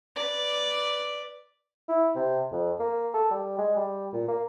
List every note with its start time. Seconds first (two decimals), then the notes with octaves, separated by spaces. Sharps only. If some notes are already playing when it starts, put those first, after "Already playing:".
0.16 B4 D5
1.88 E4
2.15 C3
2.52 F2
2.79 A#3
3.14 A4
3.31 G3
3.58 G#3
3.76 G3
4.13 A#2
4.28 A#3